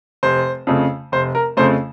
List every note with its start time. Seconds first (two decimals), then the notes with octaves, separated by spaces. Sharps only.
0.23 F1 C5
0.67 F2 C#3 A3
1.12 F1 C5
1.35 A#4
1.57 F2 C#3 A3 C5